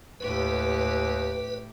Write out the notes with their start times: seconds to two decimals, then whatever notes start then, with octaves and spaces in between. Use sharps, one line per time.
0.20 D#2 A2 G4 B4